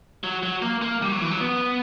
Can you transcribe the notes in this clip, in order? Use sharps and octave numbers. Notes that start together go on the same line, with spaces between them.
F#3
F#3
A#3
A#3
G3
F#3
E3
F#3
B3